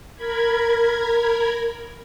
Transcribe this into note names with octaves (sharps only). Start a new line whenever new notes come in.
A#4 B5 G#6